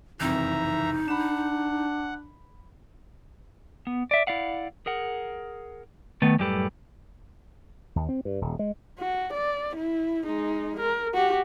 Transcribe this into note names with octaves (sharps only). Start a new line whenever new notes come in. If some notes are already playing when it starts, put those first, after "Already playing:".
F#1 C2 F2 E3 D#4 E5 A#5
D4 F#5 B5 E7
B3
D5 E5
E4 D5 F5 F#5
G#4 A#4 F#5
D#3 A3 B3 B4
F#2 A2 G3 G4 A4 B4
D#2
C4
G2
D#1
G#3
F#4
D5
E4
G#3 D#4
A#4
F#4 G4